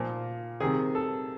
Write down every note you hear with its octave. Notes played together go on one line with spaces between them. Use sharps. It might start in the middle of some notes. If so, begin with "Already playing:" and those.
Already playing: A#2 F3
C3 D#3 G#4
A4